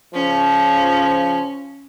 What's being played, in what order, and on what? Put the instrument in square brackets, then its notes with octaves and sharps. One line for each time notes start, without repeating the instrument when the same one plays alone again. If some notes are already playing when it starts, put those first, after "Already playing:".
[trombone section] C#3 F3 [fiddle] C#4